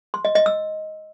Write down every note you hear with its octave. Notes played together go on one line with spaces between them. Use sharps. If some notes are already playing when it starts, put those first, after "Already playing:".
C6
D#5
D#5
E6